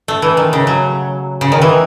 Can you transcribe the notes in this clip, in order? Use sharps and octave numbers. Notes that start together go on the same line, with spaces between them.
A3
E3
D#3
C#3
F#3
C#3
D#3
E3